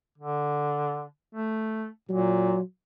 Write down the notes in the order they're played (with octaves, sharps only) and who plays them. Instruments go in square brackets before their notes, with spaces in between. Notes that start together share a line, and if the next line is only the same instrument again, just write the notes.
[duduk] D3
A3
[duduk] A#2 [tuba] F#3